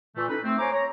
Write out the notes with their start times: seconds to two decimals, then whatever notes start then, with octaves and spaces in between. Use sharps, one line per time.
0.17 A#2 E3 A3
0.29 C#4 D#4 E4 A4 B4
0.44 A3 C4
0.59 C5 C#5 G#5 A#5 C6 D6
0.72 C#5 A#5